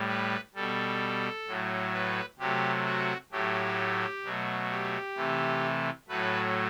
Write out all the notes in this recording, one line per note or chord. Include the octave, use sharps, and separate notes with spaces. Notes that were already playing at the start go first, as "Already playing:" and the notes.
Already playing: A2 G3
B4
B2 G3 A4
A2 F#3 A3
B4
C3 F#3 A3 G4
F#4
A2 F#3 A3 G4
B2 F#3 A3
G4
C3 E3 A3
A2 F#3 A3 B4